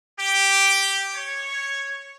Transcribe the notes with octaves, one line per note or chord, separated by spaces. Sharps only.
G4
C#5